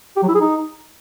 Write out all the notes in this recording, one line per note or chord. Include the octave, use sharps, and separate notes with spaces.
G4
F#3
E4
G#4
D#4